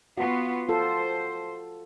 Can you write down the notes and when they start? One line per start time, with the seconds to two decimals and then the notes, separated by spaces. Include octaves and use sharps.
0.18 B3 F4 F#4
0.69 F4 A4 C5